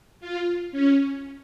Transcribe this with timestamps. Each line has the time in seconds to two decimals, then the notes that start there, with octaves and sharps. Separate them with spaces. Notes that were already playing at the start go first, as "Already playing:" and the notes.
0.20 F4
0.72 C#4